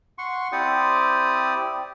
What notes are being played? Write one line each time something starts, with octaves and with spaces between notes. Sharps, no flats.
F#5 C6 C#6
C4 E4 G4 C5 D5 D#6